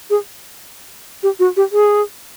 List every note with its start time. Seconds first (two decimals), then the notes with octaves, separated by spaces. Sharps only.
0.10 G#4
1.23 G4
1.39 F#4
1.57 G4
1.72 G#4